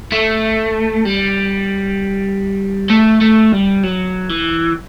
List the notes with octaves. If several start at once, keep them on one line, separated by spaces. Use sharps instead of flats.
A3
G3
A3
A3
G3
F#3
E3